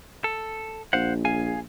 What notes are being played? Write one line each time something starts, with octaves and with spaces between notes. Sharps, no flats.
A4
A#1 C5 F5 F#5
G#4 F5 G#5